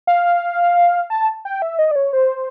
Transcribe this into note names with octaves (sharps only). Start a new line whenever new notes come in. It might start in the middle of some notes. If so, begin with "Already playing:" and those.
F5
A5
G5
E5
D#5
D5
C#5
C5